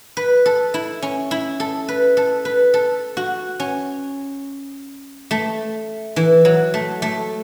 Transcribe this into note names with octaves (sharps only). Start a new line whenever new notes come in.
B4
A4
E4
C#4
E4
A4
B4
A4
B4
A4
F#4
C#4
A3
E3
F#3
A3
A3